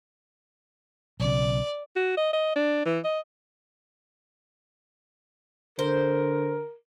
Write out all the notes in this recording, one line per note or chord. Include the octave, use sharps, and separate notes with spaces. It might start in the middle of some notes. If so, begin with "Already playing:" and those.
B1 C#3 D5
F#4
D#5
D#5
D4
E3
D#5
D3 A#4 C5